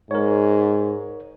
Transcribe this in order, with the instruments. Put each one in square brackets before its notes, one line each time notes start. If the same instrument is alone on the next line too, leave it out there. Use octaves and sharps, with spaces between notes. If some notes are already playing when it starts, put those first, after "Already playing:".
[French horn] G#2 [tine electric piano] A#4 C#5